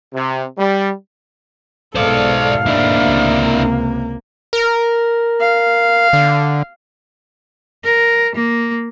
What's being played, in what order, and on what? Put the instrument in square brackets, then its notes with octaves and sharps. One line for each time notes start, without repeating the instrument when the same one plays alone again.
[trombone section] C3
G3
[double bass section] G#2 B2 [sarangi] A4 [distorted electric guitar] C5 D5 [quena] F5
[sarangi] A#3 [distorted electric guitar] D4 E4
[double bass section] C#2 C3
[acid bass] A#4
[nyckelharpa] F5
[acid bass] D3
[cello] A#4
A#3